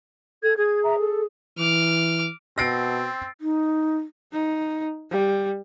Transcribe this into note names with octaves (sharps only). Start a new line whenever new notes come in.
A4 G#6
G#4 G#6
E5 A#5
A4
E3 D6 F6
B2 C4 E6 A6 A#6 C7 D7
D#4
D#4
G3